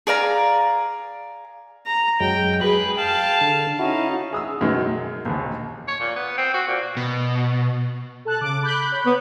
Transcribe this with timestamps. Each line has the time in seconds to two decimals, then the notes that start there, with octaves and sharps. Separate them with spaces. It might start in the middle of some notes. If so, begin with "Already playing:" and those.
0.07 G#4 D5 F5 A#5
1.86 A#5
2.20 F#2 F#3 G#3 G5
2.61 G#4 B4 B5 F#6
2.97 F5 G5 A5
3.41 D3
3.79 C#4 D#4 E4 F#4
4.33 G#4 D#6 E6
4.61 F#2 B2 D#3 G#3
5.25 A#1 D#2
5.88 C#5
6.00 A#2
6.16 B3
6.37 C4
6.54 F#4
6.68 A#2
6.97 B2
8.25 A4 A5 F#6
8.41 C#3 D6
8.63 B5 F#6 G6
8.90 C#5 B5
9.06 B3